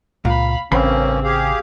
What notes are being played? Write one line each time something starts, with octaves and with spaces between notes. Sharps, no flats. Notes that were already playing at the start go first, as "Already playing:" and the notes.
C#2 A#2 F5 B5
A1 G2 C#3 A#3 C4 C#4 B5 C6
G4 G#4 F5